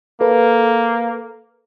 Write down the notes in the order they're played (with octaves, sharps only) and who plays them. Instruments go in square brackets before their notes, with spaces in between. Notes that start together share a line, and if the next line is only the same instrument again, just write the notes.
[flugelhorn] A#3 [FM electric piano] A4 B4